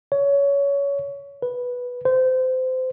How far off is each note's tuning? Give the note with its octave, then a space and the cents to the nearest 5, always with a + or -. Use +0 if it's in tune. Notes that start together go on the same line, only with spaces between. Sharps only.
C#5 +20
B4 -5
C5 -25